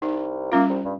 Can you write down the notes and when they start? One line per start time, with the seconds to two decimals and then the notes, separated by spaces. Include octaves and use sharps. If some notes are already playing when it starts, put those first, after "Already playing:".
0.02 C2 D#4
0.52 G3 A#3 C#4 F4
0.70 C2
0.84 G2